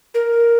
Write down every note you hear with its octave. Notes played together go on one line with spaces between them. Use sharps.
A#4